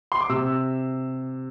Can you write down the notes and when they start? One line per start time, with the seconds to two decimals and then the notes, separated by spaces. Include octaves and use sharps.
0.12 C6
0.21 D6
0.29 C3 E6